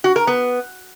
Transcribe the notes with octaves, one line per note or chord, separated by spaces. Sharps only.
F#4
A#4
B3